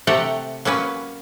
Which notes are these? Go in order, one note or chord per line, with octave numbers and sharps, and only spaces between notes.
C3 A3 G4 A4 F#5 A#5
F#3 A#3 C#4 B4